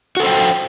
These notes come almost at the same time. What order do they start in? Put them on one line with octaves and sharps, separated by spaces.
F#4 A4 C5 G5